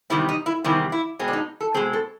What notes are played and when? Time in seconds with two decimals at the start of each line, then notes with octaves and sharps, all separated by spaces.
0.10 E2 C3 D#3 G3 C4 E4
0.29 D#4
0.46 E4
0.64 E2 C3 D#3 G3 C4 E4
0.92 E4
1.19 B2 G#3 C4
1.28 D4
1.33 D#4
1.61 A4
1.74 B2 G#3 C4 G#4
1.93 A4